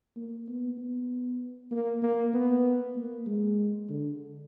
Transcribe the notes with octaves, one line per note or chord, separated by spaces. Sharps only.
A#3
B3
B3
A#3
A#3
B3
A#3
G#3
D3